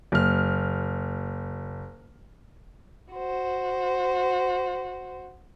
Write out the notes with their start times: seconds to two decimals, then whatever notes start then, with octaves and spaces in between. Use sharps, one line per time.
0.12 F#1 F6
3.13 F#4 C5